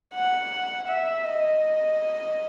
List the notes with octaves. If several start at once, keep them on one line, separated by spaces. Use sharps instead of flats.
F#5
E5
D#5